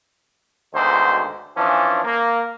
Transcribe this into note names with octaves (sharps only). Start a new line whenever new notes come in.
D2 G#2 B2 D#3 C5
E3 F3 C#4 D4
A#3